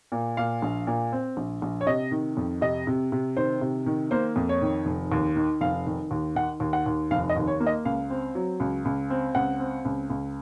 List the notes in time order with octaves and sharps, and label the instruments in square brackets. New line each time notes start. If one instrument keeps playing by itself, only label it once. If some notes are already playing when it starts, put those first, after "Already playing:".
[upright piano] A#2
A#2 F5
A#1
A#2
C4
A#1
A#1
C#5
C3 D#5
D#3
F2
C3 D#5
C3
C3
D#3 C5
C3
D#3
A#3 C5
F2
C#5
D#3
F1
D#2
D#3
F1 F5
D#3
D#2
D#3 F#5
D#2
F#5
D#2
F1 F5
D#5
D#2
C#5
A#3
D#5
C#2 F5
C4
F#3
C#2
C#2
C4
C#2 F#5
C4
C#2
C#2